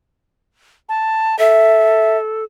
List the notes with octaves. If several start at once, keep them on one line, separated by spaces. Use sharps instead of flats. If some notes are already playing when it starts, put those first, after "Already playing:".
A5
A4 E5